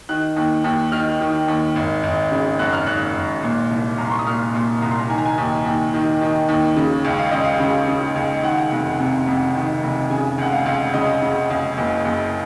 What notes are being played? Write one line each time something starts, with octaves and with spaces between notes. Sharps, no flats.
D#3 F#6
D#2
D#2
D#3 F6
D#3
D#2
G#1
G#1
C#3
F#2 F#6
F6
G#1 F#6
G#1
A#2
C2
C2 A#5
C6
C#6
D#6
A#2 F6
A#2 C6
C2 A#5
C6
A#5
D#3 G#5
A#5
G#5
D#2
D#2
D#3
D#3
D#2
C#3
C#2
F5
C#2 D#5
F5
C#3
C#3
C#2
D#3 F#5
F1
C3
F2
D#3
F1
C#3 G#5
C#2 F#5
F5
C#2
C#3 D#5
C#3
C#2
F#1
F#1